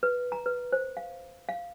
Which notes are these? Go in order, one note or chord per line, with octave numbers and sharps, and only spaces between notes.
B4
A#5
B4
C5
F5
F5